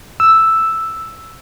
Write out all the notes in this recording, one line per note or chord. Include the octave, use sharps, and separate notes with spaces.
E6